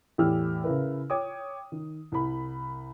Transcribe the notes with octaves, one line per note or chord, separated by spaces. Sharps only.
E2 A2 E3 G4 E6 F6
C#3 E4 A#4 B4
C#5 G5 D6 D#6
D#3
C2 B5